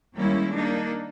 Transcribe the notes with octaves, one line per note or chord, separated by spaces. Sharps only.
D#3 G3 G#3 A#3 C#4 E4
A#3 D4 D#4